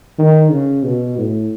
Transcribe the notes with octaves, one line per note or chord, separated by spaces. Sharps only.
D#3
C#3
B2
A2